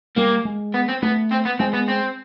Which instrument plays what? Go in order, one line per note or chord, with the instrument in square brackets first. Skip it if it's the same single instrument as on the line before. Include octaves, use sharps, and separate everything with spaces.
[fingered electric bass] G3 [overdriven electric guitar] A#3
[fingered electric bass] G#3
[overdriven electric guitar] B3
C4
[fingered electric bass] A3 [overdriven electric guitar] B3
[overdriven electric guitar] C4
B3
[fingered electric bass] G#3 [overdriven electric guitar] C4
[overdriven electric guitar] B3
C4